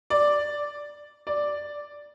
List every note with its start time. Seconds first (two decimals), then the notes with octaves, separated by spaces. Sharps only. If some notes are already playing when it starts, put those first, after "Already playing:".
0.10 D5
1.27 D5